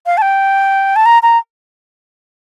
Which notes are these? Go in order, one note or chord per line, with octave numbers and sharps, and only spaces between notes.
F5
A5
G5
A5
A#5
A#5